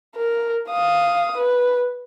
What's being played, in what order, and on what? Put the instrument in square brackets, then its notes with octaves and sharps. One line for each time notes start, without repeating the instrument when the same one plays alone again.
[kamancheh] A#4
F5 D#6
B4